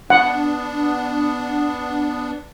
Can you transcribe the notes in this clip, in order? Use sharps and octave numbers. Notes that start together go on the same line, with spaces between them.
B3 D4 F#5